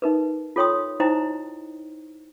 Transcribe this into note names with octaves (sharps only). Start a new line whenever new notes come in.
D#4 A#4 B4
F4 A4 C#5 G5 C6 D#6
D#4 E4 C5 D#5 G5 A#5